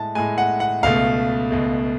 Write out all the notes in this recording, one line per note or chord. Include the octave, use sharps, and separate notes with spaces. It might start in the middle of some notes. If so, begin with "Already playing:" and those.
Already playing: A2 G#3 A5
A2 G#3 G#5
F#5
F#5
C#2 B2 A3 F5
C#2 B2 A3